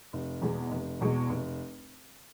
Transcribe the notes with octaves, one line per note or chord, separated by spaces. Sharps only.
F1
E2 B2 G#3
F1
E2 B2 G#3
F1